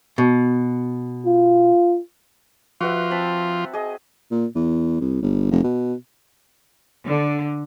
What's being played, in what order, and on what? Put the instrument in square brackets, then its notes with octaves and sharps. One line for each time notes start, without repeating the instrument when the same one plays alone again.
[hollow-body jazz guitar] B2
[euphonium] F4
[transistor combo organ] F3 F4 [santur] F#4 B4 E5
[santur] C4 A5 B5
G#4 D#5
[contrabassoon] A#2
E2
C2
G1
F1
B2
[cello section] D3